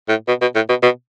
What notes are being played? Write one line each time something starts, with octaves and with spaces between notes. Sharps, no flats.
A2
B2
B2
A2
B2
B2